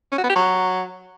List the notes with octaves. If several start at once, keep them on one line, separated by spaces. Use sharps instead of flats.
C#4
F#4
B3
G4
F#3